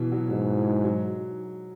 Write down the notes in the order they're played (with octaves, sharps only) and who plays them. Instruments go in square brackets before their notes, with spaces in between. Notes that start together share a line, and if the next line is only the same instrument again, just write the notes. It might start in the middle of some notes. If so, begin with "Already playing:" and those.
Already playing: [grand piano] B2 E3
F#3
[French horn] G#2 [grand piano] F#3
[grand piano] E3
F#3